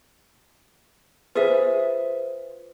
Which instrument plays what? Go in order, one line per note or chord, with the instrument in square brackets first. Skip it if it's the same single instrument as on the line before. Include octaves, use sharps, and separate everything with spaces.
[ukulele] F4 G#4 E5 [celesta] B4 C5